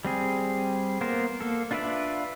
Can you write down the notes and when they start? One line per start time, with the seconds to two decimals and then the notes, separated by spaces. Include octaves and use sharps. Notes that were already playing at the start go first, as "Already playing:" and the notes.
0.05 G3 C4 G#4
1.01 A#3 B3 A#4 C5
1.41 A#3 A4
1.71 D4 F4 B4 D5 E5